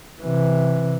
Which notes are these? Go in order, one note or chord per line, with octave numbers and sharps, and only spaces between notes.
C3 E3